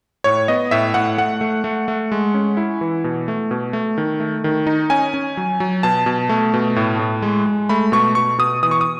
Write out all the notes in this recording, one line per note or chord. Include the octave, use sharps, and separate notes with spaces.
A2 C#5
B3 D#5
A2 E5
A2 F#5
A3 F#5
A3
A3
A3
G#3
C#4
E4
E3
B2
A3
B2
A3
D#3
A3
D#3
D#4
C#4 G#5
C#4
F#3
F#3
B2 A5
B2
A3
B2
A2
A2
G#3
G#3
A3 B5
B2 C#6
B2 C#6
B2 D#6
E3 D#6
C#6
D#6